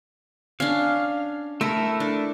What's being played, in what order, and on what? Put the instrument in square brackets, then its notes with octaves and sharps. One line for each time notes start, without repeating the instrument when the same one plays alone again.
[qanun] C#4 D4 [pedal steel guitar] F5
[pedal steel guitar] A3 E4 A4 [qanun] A#4
[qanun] D4